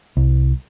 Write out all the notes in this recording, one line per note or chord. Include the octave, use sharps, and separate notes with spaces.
C2